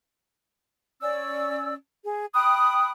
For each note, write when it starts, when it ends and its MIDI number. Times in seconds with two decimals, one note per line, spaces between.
1.01 1.75 61
1.01 1.75 74
1.01 1.75 88
2.04 2.27 68
2.35 2.91 79
2.35 2.91 83
2.35 2.91 87
2.35 2.91 90